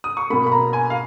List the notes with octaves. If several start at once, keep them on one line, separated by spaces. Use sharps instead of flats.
D#6
C#6
B2 A#3 B5
B5
A#5
G#5
F5